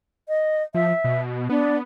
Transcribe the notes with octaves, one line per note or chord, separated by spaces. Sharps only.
D#5
F3 E5
B2
B3 D4